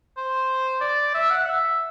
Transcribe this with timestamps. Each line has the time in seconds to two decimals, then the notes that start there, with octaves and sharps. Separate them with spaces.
0.17 C5
0.81 D5
1.14 E5
1.31 F#5
1.46 E5